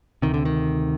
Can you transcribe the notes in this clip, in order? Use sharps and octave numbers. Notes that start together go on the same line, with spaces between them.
D2 C3 D#3
D3
D#3